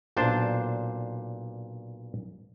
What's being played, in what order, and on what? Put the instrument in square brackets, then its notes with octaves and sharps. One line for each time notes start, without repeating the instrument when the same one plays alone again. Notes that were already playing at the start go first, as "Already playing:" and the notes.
[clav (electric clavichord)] B1 A#2 D4 C5 A5